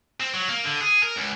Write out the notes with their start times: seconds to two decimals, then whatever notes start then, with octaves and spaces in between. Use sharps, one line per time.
0.20 C4
0.34 F#3
0.49 A#3
0.64 D3
0.81 G#4
1.03 A#4
1.16 C#2